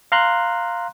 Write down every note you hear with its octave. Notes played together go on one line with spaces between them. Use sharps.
F5 A#5 C6 F#6